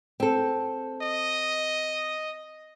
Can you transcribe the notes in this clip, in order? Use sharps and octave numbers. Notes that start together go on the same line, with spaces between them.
C4 A4
D#5